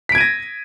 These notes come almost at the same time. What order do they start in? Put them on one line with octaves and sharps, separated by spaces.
B6 D7 G#6 D#7 A#6